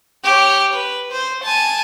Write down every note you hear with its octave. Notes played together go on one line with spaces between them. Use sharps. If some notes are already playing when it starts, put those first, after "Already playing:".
G4 C#5
B4
C5
G#5 A5